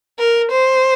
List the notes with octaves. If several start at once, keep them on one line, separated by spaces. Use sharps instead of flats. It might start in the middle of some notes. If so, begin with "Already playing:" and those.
A#4
C5